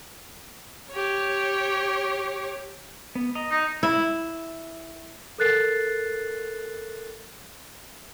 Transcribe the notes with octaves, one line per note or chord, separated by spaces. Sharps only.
G4 C#5
B3
D#5 A#5
D#4
E4
A4 A#4 F#6 A6 C7